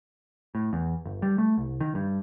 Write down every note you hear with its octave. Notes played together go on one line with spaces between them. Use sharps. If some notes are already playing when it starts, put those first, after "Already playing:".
A2
E2
G1
G3
A3
C2
D#3
G2